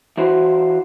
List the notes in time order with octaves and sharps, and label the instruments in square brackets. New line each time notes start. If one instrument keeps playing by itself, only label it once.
[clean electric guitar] E3 F#4 C5